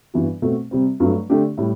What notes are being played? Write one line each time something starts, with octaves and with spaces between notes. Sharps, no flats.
G2 E3 B3 F#4
B2 A3 C4 F#4
C3 G3 C4
G2 F#3 A3
D3 A3 D4 G4
A2 G3